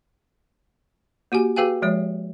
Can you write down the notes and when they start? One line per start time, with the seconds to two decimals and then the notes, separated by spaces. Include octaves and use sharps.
1.32 A#3 F#4 G4 G#5
1.56 F#4 G#4 B4 F5 G5 G#5
1.82 F3 G#3 C#5